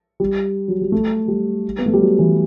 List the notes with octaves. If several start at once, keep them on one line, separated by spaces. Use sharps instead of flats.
G3
F#3
G3
A3
G3
B3
A3
G3
F#3
E3